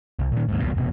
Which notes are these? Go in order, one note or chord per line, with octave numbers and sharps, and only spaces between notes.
C2
A#2 D#3
D#2 G#2
E1 C2 B2
F1 B2